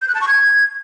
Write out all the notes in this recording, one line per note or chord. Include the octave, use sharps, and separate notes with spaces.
G6
F#6
A5
C#6
G#6